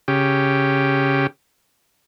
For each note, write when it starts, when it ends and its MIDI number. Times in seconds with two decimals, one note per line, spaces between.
0.08 1.27 49
0.08 1.27 67